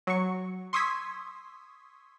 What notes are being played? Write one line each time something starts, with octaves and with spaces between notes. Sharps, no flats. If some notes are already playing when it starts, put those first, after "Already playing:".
F#3 C#6
C6 C#6 D#6 E6 G#6 B6